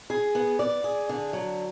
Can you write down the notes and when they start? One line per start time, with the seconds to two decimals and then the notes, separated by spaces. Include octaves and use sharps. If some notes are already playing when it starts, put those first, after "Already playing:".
0.10 G#4
0.35 B3
0.59 D5
0.84 G#4
1.09 D3
1.33 F#3